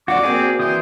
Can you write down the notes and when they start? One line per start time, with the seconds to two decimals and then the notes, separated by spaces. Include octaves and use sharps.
0.08 F2 F4 F#4 D5 D6
0.23 G3 A#3 C4 F#4 G#4
0.60 E3 C5 D#6